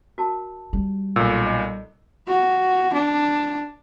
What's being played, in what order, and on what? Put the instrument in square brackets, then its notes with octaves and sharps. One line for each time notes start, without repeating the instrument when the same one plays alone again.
[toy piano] F#4 A#4 A5
[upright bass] G3
[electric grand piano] B1 A#2 [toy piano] A4 B5 E6
[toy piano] D#5
[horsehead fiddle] F#4
D4